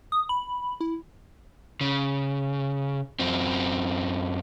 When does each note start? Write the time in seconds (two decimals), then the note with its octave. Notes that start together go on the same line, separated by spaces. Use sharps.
0.12 D#6
0.29 B5
0.80 E4
1.81 C#3
3.20 F#2 C4